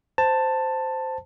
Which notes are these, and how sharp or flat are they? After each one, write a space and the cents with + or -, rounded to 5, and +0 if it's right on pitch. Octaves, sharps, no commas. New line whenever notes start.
C5 -10 A5 +10